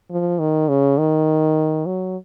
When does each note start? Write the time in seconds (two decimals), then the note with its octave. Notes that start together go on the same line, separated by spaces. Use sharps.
0.10 F3
0.39 D#3
0.69 C#3
0.98 D#3
1.86 F#3